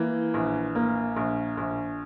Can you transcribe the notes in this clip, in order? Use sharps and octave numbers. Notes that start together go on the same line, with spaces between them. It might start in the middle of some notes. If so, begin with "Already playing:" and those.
Already playing: E3 A#3
A#1
A#3
A#1
A#1